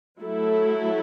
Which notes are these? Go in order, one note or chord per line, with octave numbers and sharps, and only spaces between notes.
F#3 A3 E4 A4